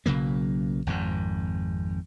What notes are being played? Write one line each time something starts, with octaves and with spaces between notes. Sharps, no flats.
B1 C#3 F#3 A#3
G#1 F2 G#2